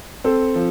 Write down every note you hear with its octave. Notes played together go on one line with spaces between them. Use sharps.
C4 A4
F3